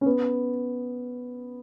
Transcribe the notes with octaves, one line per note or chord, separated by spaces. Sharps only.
C#4
B3